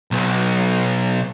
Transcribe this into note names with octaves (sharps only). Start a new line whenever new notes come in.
B1